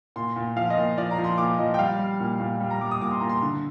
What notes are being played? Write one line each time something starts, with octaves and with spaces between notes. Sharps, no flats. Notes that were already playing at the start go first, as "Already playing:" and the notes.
A#2 C6
A#2
F3 F5
D#5
A#2
F3 D5
A#5
F3
C6
A#2 D6
F3 D#5
G5
G3 F5
G3
A#2
A#2
G3
A#5
G3 D6
D#6
A#2 D6
C6
A#2 A#5
C6
D3